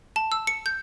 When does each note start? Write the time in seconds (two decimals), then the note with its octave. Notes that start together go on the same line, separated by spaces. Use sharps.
0.16 A5
0.32 E6
0.47 C#7
0.66 G6